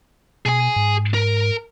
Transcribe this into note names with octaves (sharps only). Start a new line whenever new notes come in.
B2 G#4 G#5
G#2
A#4